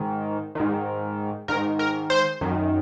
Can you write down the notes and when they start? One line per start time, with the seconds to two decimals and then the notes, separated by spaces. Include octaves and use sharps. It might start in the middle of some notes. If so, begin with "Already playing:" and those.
Already playing: G#2 D#3
0.55 G#2 D#3
1.48 G#2 D#3 A#4
1.79 A#4
2.10 C5
2.41 F#2 D#3